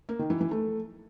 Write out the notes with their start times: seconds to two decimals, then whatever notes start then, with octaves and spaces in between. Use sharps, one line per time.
0.09 A#3
0.19 D#3
0.30 E3
0.41 E3
0.51 A3